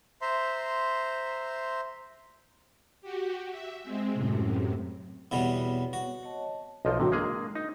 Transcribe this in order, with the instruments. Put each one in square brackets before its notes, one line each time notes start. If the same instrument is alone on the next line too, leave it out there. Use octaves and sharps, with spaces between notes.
[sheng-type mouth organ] C5 E5 A#5 C6
[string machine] F#4 G4
E5
G#3 C4
F#2 A2 C3
[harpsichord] E2 B2 G3 [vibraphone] B3 C4 C#5
[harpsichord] F#4
[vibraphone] C#5 D#5 A5
[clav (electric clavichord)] B1 F3 [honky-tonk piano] A4 D#5
[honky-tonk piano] G#2 F#3 G5 [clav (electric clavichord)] C3
[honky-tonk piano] D3 [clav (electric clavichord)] G#3 A#3 G#4
[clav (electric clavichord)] D#4